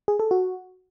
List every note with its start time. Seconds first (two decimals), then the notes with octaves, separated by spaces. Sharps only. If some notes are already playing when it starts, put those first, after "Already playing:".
0.08 G#4
0.20 A4
0.31 F#4